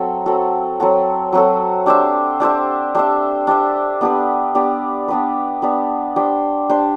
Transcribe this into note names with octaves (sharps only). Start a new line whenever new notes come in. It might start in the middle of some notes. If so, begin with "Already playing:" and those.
Already playing: F#3 C4 F#4 A4
F#3 C4 F#4 A4
F#3 C4 F#4 A4
F#3 C4 F#4 A4
D4 G4 C5 E5
D4 G4 C5 E5
D4 G4 C5 E5
D4 G4 C5 E5
B3 D4 G4 B4
B3 D4 G4 B4
B3 D4 G4 B4
B3 D4 G4 B4
D4 G4 C5
D4 G4 C5